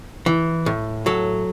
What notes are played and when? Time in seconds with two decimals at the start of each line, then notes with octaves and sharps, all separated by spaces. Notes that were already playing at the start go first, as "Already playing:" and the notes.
0.26 E3
0.66 A2
1.06 F#3 A4